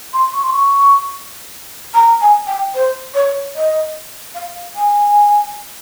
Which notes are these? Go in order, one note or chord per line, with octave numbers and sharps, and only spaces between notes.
C6
C#6
C6
C#6
A#5
G#5
G5
C5
C#5
D#5
F5
G#5